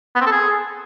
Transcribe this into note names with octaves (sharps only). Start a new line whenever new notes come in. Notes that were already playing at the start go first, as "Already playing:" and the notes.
B3
C4
A4
G#4